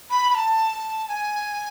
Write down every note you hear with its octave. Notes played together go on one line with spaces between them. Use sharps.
B5
B5
A5
G#5